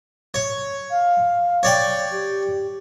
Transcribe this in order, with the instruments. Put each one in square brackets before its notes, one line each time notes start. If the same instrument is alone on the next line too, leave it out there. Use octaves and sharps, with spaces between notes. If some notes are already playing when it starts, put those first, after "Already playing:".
[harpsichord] C#5
[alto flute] F5
[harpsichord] C#5 D5 G5
[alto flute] G4